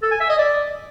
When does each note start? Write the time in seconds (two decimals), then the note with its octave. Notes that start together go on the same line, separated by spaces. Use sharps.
0.02 A4
0.11 G#5
0.20 E5
0.29 D#5
0.38 D5